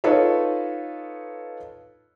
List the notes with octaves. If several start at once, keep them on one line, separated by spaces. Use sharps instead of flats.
D#4 F4 A4 B4 C#5